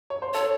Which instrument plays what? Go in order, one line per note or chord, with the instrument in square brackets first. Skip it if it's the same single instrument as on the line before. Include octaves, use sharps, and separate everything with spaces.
[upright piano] C#5
C5
[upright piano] A4 [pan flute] C#5